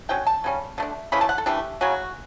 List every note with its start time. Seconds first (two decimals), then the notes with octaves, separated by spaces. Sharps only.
0.09 D3 F#3 C#4 G5
0.27 A5
0.44 C#3 G3 C#4
0.78 D3 A3 D4
1.12 C#3 E3 A3 C#4 B5
1.21 A5
1.29 F#5
1.38 A4
1.46 E3 A3 D4 G4
1.81 C#3 F#3 C#4 F#4